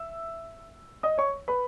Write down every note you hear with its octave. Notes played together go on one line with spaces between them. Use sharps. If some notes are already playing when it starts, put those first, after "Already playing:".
Already playing: E5 E6
D#5 D#6
C#5 C#6
B4 B5